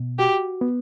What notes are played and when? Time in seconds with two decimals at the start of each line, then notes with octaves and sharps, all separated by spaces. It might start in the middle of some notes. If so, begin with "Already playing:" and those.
Already playing: B2
0.18 F#4 G4
0.61 B3